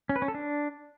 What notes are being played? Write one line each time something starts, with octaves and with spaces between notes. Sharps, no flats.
C#4
B4
C#4
A4
D4